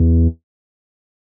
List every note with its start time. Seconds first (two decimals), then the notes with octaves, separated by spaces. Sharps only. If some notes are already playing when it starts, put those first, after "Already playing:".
Already playing: E2